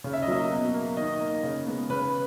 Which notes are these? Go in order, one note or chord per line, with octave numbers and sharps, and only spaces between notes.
C#3
E5
D#5
F#3 A#3 E5
B2
A#3
D#3 D#5
A#3
C#3
G#3 B3
C#3 B4